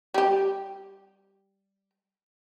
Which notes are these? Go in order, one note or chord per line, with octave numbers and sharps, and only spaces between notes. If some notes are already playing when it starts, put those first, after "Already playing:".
G3 G4